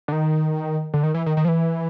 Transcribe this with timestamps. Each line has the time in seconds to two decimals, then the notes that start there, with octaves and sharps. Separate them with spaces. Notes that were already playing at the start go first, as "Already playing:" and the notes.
0.08 D3
0.12 D#3
0.94 D3
1.03 D#3
1.14 E3
1.26 D#3
1.37 D#3
1.45 F3
1.48 E3